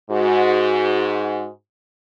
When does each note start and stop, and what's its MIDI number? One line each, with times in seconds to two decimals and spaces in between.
0.10 1.49 44
0.10 1.49 66